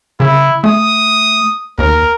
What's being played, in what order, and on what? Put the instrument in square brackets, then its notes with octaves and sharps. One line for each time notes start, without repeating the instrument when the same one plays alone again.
[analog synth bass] C#3 [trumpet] E4
[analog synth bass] A3 [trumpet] D#6
[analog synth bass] D#2 [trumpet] A#4